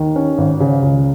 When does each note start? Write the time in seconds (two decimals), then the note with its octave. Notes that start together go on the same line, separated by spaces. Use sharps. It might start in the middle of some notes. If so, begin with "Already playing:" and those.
Already playing: D#2 D#3
0.16 C#4
0.38 G#1
0.60 C#3
0.82 C#2